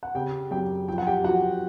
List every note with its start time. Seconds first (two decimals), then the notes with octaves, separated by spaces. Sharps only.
0.03 F#5
0.15 C#3 G4 G5
0.51 F#2 G4 G5
0.88 F3 G5
0.98 F#5
1.07 G4 G5
1.24 F3 F#4 F#5